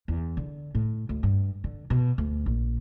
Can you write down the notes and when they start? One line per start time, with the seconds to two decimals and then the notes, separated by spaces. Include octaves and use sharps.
0.08 E2
0.37 D3
0.75 A2
1.09 D2
1.23 G2
1.64 D3
1.90 B2
2.18 D2
2.46 A#1